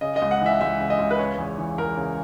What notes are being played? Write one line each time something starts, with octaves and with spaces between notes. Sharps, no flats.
C#3 D#5
D#5
C#2
F#5
E3 E5
C#2 E5
C#3
D#5
C#2
B4
C#3 C#5
E2
E3
E2 A#4
C#3